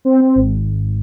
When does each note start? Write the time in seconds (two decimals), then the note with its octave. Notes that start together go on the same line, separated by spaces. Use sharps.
0.05 C4
0.21 C4
0.35 G#1